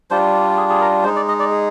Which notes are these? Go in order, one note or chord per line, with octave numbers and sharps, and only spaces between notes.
G3 D4 F4 C5
G#4
G#4
A#4
G#3 D#4 C5
D5
D#5
D5
G#4